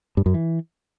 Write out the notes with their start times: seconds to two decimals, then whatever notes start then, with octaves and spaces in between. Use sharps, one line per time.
0.17 G2
0.26 F#2
0.34 E3